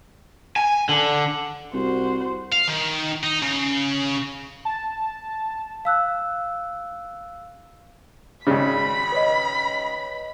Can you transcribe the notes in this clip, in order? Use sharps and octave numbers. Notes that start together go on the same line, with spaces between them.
G#5
D3
C2 F#4 C5
F5
D#3
D#4
C#3
A5
F5 E6 F#6
G#1 C#3 C5 D5 B5
B4 C#5 D#5